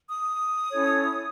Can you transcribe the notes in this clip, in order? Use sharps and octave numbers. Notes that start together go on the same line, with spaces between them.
D#6
C#4 E4 A4 C#5